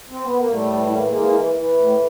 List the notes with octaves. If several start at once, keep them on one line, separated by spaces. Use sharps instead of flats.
C4
B3
A#3
A2 G3 A3
E3
E3 A#3
A3
G#3 A#3
E3
E3
E3
A2